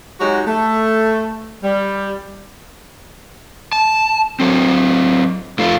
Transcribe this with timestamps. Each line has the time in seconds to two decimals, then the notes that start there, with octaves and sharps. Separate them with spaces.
0.20 F#3 G#3 D#4 F#4 G4 C#5
0.47 A3
1.63 G3
3.73 A5
4.40 F#3 C4
5.59 F2 A3 F4